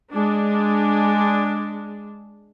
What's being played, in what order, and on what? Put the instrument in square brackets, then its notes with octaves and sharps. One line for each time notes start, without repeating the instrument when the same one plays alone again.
[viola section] G#3 D4